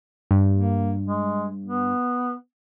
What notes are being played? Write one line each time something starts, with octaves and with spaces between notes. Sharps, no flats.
G2
A#3
G#3
B3